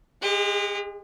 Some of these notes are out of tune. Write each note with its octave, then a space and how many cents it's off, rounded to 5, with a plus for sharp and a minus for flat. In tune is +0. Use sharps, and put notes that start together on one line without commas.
G#3 +0 G4 +45